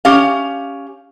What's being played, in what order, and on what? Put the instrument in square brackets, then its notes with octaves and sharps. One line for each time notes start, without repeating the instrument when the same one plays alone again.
[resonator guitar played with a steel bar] C#4 G4 F5